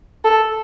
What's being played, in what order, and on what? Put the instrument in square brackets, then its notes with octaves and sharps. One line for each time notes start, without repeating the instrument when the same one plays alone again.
[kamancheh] A4